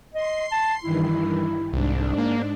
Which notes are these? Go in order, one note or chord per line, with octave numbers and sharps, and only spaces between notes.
D#5 C6 C7
A5
G2 D#3 E3 E4
C2 G#2 D4
A#3